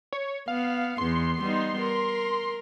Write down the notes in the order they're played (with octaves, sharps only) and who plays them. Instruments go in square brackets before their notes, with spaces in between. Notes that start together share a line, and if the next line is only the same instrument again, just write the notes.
[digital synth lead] C#5
[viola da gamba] B3 [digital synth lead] F5
[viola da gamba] E2 B3 [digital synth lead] C6
[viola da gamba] G3 B3 D#4
A#4